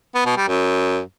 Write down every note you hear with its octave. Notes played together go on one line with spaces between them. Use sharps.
B3
B2
G3
F#2